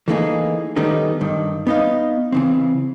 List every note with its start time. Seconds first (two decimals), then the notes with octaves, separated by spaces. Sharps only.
0.08 E3 A3 A#3 D#4 G4 G#4
0.76 D#3 G3 A3 B3 C#4 D#4
1.21 G2 D#3
1.67 B3 D#4 D#5 F5
2.32 C#3 E3 C4